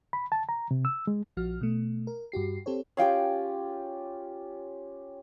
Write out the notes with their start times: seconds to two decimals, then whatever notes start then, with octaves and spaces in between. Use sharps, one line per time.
0.13 B5
0.32 A5
0.49 A#5
0.71 C3
0.85 E6
1.07 G#3
1.37 A#1 F3 F#4 F6
1.61 B2 A3
2.07 A#4
2.32 G2 F#4 G4 C7
2.66 C4 G4 A4 C5 C#5
2.97 C#4 F4 G4 G#4 F5 G5